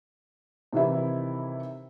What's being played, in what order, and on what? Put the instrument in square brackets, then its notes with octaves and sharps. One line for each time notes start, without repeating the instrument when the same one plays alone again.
[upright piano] C3 D#3 E3 E4